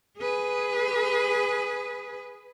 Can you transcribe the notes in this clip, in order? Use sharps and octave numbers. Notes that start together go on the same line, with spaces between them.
G#4 B4